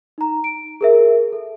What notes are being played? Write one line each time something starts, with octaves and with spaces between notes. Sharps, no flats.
D#4 A#5
D7
G#4 A#4 E5
A4